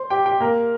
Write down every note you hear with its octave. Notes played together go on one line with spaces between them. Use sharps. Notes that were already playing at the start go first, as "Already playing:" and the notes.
Already playing: C5 C6
G4 G5
G4 G5
A#3 A#4